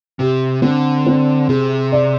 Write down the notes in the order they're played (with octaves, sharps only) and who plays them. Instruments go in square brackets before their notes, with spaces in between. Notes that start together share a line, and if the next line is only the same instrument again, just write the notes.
[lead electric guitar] C3 [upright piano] G4
[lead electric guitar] D3 [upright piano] C4
[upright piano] C4
[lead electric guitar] C3 [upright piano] G#4
[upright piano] D5